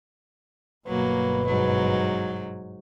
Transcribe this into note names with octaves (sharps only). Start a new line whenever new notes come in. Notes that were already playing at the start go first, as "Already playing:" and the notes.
G1 B2 F#3 A#3 B4
G#2 F#3